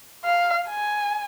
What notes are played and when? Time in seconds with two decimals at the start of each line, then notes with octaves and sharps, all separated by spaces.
0.25 F5
0.69 G#5